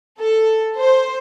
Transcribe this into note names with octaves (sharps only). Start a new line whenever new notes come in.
A4
C5